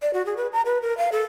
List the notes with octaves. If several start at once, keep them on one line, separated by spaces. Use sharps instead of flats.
D5
F#4
G#4
B4
A#5
B4
A#4
F5
A4